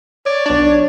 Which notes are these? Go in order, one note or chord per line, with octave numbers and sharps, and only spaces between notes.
C#5 D5
B1 D4 D5